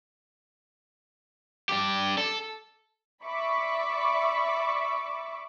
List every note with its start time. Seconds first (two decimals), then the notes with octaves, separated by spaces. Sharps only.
1.69 D4 G4
2.18 A4
3.24 D5 E5 B5 C#6 D6